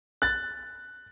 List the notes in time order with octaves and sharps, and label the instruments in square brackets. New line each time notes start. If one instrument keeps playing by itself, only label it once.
[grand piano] F#6 A6